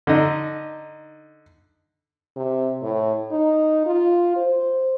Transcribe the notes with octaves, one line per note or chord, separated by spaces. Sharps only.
D3 D#4
C3
A2
D#4
F4
C5